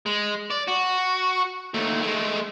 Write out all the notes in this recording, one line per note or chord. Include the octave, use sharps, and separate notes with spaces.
G#3
D5
F#4
D#2 A3
G#3 A3